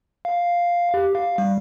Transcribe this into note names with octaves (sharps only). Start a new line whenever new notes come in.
F5
G4
F5
G3